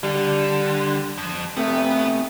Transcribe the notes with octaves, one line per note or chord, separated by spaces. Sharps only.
D3 G3
F2
C3 A3 B3